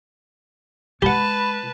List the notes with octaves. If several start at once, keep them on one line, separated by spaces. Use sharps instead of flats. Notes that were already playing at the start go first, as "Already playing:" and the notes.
G#3 G4 B4 F#5 A5 B5